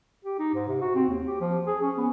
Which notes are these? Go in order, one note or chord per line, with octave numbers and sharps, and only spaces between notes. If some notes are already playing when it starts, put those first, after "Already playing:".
G4
D#4
G#2
C3
F#4
C4
D#2
G4
F3
G#4
C#4
B3